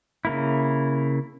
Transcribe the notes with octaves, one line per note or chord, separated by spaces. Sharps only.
C#3 A#3 E4